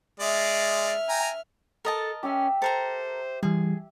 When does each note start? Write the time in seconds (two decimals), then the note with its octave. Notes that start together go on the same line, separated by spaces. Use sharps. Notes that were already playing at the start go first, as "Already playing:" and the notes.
0.20 G#3 D5 E5 F6
1.09 G5 G#5 A#5
1.85 A4 A#4 D#5 A5
2.23 C#4 G4 E5
2.62 A4 A#4 C5 A#5
3.43 E3 G3 G#4